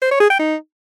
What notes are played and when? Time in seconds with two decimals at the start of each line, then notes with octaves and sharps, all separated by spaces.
0.02 C5
0.11 C#5
0.21 G#4
0.30 G5
0.39 D#4